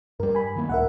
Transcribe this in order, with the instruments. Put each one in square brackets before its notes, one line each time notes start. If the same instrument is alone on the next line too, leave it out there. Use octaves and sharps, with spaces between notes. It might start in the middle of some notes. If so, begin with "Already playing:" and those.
[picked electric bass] G2 G3 [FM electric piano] A#4
[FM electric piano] G#5 B5
[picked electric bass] D#3 F#3 A#3
[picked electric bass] C#2 A2 [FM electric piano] A#4 E5 F#5